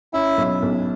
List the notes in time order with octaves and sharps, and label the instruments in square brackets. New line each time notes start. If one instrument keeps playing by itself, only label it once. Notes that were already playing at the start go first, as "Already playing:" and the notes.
[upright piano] C#4 [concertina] E4 E5
[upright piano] B1
B1